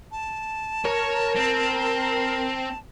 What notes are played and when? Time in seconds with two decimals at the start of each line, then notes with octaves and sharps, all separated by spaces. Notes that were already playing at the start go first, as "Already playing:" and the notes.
0.12 A5
0.85 A#4 C#5
1.36 C4